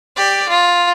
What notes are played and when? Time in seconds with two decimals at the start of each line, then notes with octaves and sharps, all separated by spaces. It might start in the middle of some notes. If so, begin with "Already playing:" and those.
0.17 G4 D5
0.49 F4